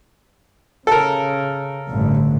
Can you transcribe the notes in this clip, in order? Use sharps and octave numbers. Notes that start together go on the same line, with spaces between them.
C#3 A4 A#4
A1 G2 D3